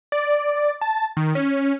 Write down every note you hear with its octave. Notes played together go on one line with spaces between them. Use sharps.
D5
A5
D#3
C#4